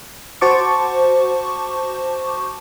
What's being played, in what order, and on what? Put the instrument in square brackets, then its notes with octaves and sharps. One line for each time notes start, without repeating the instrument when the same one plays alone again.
[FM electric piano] F#4 C5 A5 C#6 D6